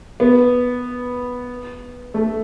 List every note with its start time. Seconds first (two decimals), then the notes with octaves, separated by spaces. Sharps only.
0.20 B3
2.14 A3